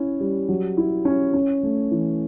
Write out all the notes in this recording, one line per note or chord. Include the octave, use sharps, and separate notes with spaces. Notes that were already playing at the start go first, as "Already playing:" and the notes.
Already playing: C#4 E4
G3
F#3
E4
C#4
C#4
A3
E3